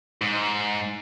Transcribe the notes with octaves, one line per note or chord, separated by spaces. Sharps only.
G#2